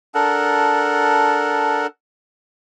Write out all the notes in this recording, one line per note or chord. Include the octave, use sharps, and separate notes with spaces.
D4 A4 A#4 F#5